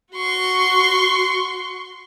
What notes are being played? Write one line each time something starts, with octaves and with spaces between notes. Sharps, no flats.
F#4 C6 C#6